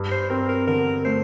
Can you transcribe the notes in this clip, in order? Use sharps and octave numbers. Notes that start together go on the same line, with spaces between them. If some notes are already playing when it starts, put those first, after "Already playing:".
Already playing: G2
C5
C4 A#4
A#4
D3 A#4
A3 C5